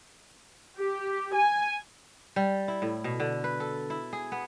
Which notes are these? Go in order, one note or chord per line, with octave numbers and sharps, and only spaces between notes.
G4
G#5
G3
E4
A2
B2
D3
B4
A4
E4
G#4
B3